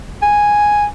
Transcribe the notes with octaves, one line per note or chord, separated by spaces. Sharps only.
G#5